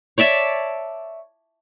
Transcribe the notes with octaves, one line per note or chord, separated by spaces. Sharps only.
C#5 D5 E5 A5